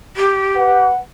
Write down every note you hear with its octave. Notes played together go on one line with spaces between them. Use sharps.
G4
B4 F#5